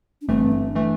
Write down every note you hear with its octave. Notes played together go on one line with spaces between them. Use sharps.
D4
G1 G2 E3 A3 C4
D4
E3 A3